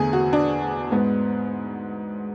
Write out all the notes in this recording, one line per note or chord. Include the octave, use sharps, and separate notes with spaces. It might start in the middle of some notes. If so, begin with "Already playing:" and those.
Already playing: E2 D3 A3 G#4
F#4
D4
G#2 G#3 B3